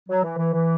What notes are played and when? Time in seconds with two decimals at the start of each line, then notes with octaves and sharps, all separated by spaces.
0.09 F#3
0.23 E3
0.38 E3
0.53 E3